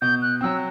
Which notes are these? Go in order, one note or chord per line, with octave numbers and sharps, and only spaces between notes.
B2 G6
F#6
F#3 C4 E6